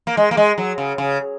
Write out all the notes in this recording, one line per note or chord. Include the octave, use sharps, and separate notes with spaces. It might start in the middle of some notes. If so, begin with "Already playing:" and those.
A#3
G#3
A#3
G#3
F#3
C#3
C#3